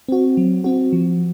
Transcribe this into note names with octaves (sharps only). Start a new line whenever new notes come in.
C4 F#4
F#3
C4 F#4
F3